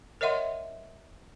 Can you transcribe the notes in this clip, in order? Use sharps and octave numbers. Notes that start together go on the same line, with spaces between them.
A#4 C#5 D#5 E5 F#5 C6